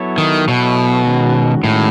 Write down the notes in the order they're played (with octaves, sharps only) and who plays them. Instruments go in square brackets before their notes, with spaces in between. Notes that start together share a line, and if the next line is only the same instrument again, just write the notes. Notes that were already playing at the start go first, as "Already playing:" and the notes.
Already playing: [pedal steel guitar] F#3 B3 E4 A4 C#5
[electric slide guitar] D#3
[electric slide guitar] B2 [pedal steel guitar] F#3 B3 E4 A4 C#5
[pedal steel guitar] D#3 G#3 C#4 F#4
[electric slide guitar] A2 [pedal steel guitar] D#3 G#3 C#4 F#4